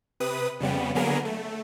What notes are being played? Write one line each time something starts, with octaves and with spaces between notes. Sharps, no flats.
C3 B4 D#6
F2 C#3 G3 B3
D3 F#3 A#3 B3 G#4 A#4
A3